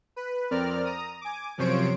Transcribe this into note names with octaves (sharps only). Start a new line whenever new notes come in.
B4
F2 C4 A#4 D5 F6
A#5 D#6
G#5 D6
F#2 C3 F3 C5 C#5 D7